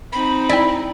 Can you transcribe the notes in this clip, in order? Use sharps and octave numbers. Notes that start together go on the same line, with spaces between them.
C4 D#4 B5
E4 D5 G5